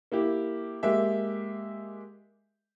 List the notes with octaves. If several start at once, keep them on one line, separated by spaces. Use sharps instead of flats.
A#3 E4 G4
G#3 A#3 G4 E5